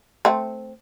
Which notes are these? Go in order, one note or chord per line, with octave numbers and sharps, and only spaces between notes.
A3 C4